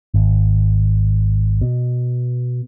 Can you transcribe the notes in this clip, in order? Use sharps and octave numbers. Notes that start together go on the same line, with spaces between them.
G#1
B2